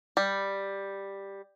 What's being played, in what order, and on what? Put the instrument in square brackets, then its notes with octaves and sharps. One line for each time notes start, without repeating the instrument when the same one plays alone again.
[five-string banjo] G3